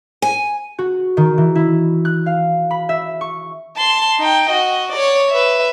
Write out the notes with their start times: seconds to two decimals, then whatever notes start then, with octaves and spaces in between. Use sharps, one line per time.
0.22 G#5
0.78 F#4
1.17 D#3
1.38 E3
1.55 E4
2.05 F#6
2.26 F5
2.71 B5
2.89 E5
3.21 C#6
3.77 A5 C6
4.19 D#4 G5
4.50 F#4 D#5
4.92 C#5 D5
5.31 B4 E5